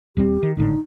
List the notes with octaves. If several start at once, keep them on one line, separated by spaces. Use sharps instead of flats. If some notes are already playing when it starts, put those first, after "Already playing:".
D#1 G3 C4 G4
D#3
G#1 A2 D3 D#4